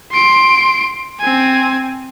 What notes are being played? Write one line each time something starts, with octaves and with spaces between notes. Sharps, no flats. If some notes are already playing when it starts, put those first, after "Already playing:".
C6 D7
C4 G#5